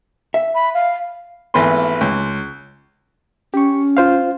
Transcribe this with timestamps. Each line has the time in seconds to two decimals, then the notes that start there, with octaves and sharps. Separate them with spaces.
0.34 E5
0.55 B5
0.74 F5
1.54 G#1 E3 A3 B3 B4 C6
2.01 C#2
3.54 C#4 G4 C#6
3.97 F4 C5 F5